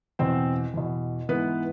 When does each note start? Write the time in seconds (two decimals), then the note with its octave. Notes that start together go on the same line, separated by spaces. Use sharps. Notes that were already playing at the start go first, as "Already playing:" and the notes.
0.19 E2 B2 C4 C5
0.74 E2 B2
1.29 G#2 E3 B3 B4